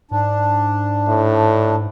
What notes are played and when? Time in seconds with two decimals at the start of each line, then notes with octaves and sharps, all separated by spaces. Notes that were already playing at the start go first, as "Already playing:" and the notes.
0.11 G#2 D4
1.08 A2